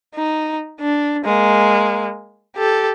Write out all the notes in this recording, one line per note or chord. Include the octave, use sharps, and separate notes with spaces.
D#4
D4
G#3 A#3
G4 A4